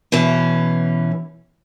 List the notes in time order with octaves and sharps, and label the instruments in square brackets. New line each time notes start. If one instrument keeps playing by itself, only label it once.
[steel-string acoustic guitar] B2 E3 C#4